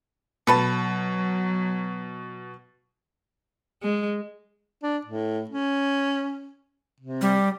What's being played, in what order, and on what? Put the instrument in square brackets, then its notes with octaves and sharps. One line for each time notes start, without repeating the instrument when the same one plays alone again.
[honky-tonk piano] B2 [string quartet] F#3 [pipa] A4 B4 A5
[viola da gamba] G#3
[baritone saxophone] D4
A2
C#4
C3
[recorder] G3